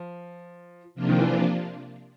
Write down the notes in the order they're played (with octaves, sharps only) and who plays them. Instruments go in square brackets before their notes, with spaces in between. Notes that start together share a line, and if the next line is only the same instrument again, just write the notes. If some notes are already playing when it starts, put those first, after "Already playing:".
Already playing: [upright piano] F3
[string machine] C3 F3 A#3 D4 F4
[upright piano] D#3
E3